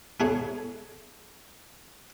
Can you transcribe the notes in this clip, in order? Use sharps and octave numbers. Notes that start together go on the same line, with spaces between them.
B3 E4 G#4 A4 C#5